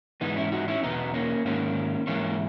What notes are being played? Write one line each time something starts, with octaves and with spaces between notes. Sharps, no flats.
G#2 E3 B3 D#4
C#4 E4
D#4 F#4
C#4 E4
E2 B2 B3 D#4
A#3 C#4
G#2 D#3 A#3 C#4
G#2 E3 A#3 C#4